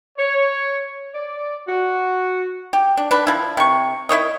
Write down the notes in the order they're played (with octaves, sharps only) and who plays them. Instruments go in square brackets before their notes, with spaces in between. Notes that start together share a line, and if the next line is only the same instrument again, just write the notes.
[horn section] C#5
D5
F#4
[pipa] G4
D4
D4 B4
F3 E4
C3 C#6
E4 C5 C#5 D#5